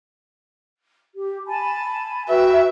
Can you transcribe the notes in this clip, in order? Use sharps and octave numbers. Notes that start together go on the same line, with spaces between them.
G4
G#5 A5 B5
F#4 B4 E5 G5